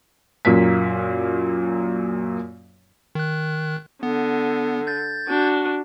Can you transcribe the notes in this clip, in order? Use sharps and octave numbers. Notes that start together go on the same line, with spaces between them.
F#2 A#2 A#3 B6
D#3 F#6
D3 B3
G6 A6
D4 F#4